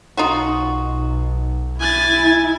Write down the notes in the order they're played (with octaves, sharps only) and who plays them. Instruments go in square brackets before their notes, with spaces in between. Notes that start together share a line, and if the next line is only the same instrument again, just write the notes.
[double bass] B1 [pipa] D#4 F4 F#4
[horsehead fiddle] E4 [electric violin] G#5 A6